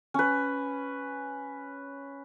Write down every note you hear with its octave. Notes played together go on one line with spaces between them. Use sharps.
C#4 B4